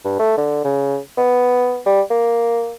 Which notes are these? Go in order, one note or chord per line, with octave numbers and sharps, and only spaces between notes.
G2
A3
D3
C#3
B3
G3
A#3